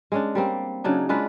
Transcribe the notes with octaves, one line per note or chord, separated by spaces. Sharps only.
G#3 C#4 D4
G3 A#3 C4
C#3 F#3 D4 D#4
G#3 D4 F4 B4